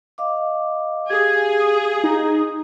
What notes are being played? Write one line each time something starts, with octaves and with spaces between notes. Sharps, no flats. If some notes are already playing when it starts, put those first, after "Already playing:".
D#5 F5 D6
G4 G#4 F5 G#6
D#6
D#4